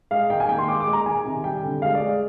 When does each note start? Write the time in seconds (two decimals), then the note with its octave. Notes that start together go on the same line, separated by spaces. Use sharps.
0.11 G#3 F5
0.30 D#3 G5
0.40 G#5
0.49 A#3 G5
0.58 C6
0.68 G#3 D6
0.80 D6
0.87 G#3
0.93 A#5
1.06 D#3 G#5
1.25 C3
1.44 G3 G5
1.63 D3
1.82 G#3 F5
1.95 D5
2.01 G#3